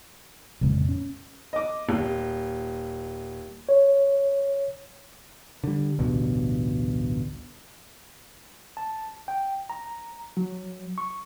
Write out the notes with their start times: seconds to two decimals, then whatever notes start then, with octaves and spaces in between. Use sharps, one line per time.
0.61 F2 A#2 C#3 G#3 C4
0.89 C#4
1.53 D#5 D6
1.89 D#1
3.69 C#5
5.64 D3 G3
5.99 A1 D2 G2 B2
8.77 A5
9.28 G5
9.70 A#5
10.37 F#3
10.98 C#6